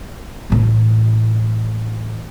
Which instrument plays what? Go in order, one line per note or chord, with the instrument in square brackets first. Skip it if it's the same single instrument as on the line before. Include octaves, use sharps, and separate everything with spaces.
[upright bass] A2 E3